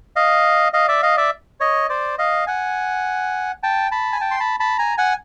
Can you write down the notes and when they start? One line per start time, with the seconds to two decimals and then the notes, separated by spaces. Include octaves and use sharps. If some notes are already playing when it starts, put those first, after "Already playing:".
0.16 D#5 F5
0.73 D#5 F5
0.88 D5 E5
1.02 D#5 F5
1.17 D5 E5
1.60 C#5 D#5
1.89 C5 D5
2.18 D#5 F5
2.47 F#5 G#5
3.63 G5 A5
3.91 A5 B5
4.13 G#5
4.20 G5 A5
4.31 C6
4.40 A5 B5
4.60 A5 B5
4.78 G#5 A#5
4.97 F#5 G#5